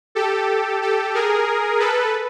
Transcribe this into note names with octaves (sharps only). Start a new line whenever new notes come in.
G4 A4
G4 A4
G#4 A#4
A4 B4